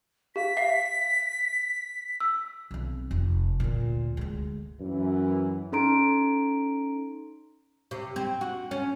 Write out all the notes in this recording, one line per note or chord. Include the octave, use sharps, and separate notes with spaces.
G4 F5 B6
E5 F5 C7
E6
B1 C4
F1
D2 A#2
D2 G#3
F#2 E3
C#4 D#4 A4 A#5 C6 D7
C3
C4
F#4
C#4